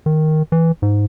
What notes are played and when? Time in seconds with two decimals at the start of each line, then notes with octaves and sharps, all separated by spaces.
0.06 D#3
0.52 E3
0.82 G#2